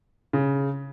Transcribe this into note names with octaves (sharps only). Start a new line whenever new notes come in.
C#3